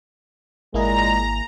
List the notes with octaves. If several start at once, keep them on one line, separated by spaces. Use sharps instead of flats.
G#1 A#2 G#3 A#3 E4 G#4 A#5